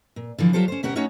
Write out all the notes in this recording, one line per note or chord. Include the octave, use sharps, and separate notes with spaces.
A#2
D3 E3 F3
F#3 F4 G4 A4 C5
C#4 C5
D2 B2 C#4 G4 A#4 F#5
A3 C#4 D#4 F#4 C#5 F#5